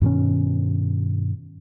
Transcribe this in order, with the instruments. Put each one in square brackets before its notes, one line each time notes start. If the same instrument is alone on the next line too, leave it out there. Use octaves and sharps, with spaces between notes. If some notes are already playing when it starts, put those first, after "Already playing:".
[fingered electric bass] G2 B2 D#3 C#4